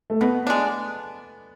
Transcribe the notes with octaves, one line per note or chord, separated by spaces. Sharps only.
A3
B2 B3
G#3 D4